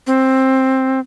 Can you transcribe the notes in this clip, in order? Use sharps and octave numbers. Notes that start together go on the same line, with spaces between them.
C4